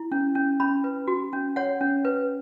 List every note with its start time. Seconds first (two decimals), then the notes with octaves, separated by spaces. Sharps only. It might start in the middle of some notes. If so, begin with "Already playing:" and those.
Already playing: E4
0.12 C#4
0.35 C#4
0.60 C#4 B5
0.84 B4
1.08 F#4
1.33 C#4
1.56 C#5 F#5
1.81 C#4
2.05 B4